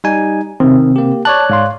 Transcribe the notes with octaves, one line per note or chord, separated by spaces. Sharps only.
G3 D#4 G#5
C3 D#3 C4
A#3 G4
C#5 D5 A5 F#6
G#2 F5 C6